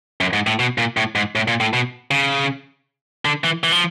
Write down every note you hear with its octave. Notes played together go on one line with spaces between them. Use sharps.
F#2
G#2
A2
B2
A#2
A2
G#2
A2
A#2
A2
B2
C#3
D3
E3
E3
F3